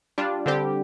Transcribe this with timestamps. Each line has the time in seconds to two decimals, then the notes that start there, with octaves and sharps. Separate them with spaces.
0.18 G3 D4 F4
0.46 D3 G3 C4 G4